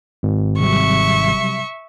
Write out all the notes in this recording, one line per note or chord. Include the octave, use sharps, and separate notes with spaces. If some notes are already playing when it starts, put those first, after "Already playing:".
G#1
C3 F#3 G3 E5 C#6